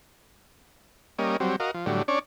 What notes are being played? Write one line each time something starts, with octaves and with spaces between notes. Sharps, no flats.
G3 A#3 C#4 D#5
F#3 G3 C4
F#4 A#4 D#5 F5
F3
A2 D3 F#3 G3
C#4 D4 C#5 D5